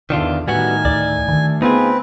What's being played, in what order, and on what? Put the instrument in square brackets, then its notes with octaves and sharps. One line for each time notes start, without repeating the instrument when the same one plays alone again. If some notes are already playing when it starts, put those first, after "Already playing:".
[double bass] E2 D3 [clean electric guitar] D#3 D4 F4
[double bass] A2 D#3 [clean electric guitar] G3 B3 F#4 [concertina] G#5
[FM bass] D2 [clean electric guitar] D5
[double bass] D2 [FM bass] D#3
[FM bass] B3 [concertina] C4 B4 [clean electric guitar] D#4 F4 G#4